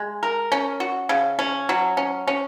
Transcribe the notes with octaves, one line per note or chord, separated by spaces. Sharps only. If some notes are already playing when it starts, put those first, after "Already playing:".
Already playing: G#3
A#4
C#4
F#4
C#3
C#4
F#3
C#4
C#4